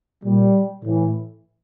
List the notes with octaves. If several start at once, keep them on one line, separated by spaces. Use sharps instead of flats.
A#2 G3
A2 E3